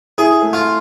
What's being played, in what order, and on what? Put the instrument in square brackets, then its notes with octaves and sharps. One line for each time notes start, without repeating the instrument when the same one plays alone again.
[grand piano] E4 [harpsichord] G#4
[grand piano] A3
[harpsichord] F4